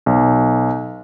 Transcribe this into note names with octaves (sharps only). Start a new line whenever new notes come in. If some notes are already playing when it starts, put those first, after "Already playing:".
B1